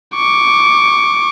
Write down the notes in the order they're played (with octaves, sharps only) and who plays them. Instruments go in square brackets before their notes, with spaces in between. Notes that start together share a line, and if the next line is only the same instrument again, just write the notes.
[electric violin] C#6 D6